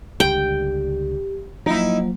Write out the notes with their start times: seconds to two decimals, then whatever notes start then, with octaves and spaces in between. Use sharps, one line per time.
0.20 C#2 D3 G3 G4 G5
1.66 F3 F#3 A#3 D#4 E4